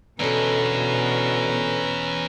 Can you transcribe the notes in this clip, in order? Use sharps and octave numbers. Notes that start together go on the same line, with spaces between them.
E2 B2 D3 C#4 A4 B4 A#5